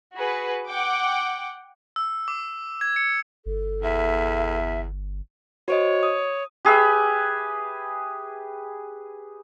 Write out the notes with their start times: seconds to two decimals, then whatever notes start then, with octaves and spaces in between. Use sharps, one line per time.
0.15 F#4 G#4 B4
0.68 F#5 G5 D6
1.96 E6
2.28 D6
2.81 G#6
2.96 C#7
3.46 G1 A4
3.83 E2 E5
5.68 F#4 C5 C#5 D#5
6.03 D#6
6.65 G4 G#4 B4 E5